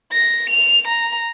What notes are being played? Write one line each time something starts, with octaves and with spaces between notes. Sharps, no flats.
A#6
F7
A#5